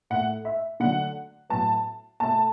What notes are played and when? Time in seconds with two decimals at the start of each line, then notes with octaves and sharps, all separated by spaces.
0.10 A2 A3 F#5
0.45 E5
0.80 D3 F#3 A3 F#5
1.50 A2 F#3 B3 A5
2.20 B2 A3 A5